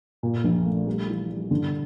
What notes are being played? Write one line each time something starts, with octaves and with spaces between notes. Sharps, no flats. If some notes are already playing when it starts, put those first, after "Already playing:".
A#2
A#1
A3
G3
E3
G3
D3